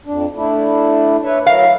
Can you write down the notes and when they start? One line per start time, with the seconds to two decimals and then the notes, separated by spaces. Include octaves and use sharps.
0.06 F2 D4
0.35 A3 D4 E4
1.24 B4 C#5 E5
1.47 F#3 E4 A#4 F5